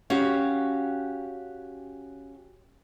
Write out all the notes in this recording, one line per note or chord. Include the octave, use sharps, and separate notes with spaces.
C#4 F#4 G4 F5